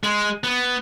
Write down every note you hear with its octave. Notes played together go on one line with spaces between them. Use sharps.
G#3
B3